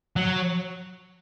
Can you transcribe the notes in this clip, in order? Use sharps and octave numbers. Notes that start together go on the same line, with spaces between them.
F#3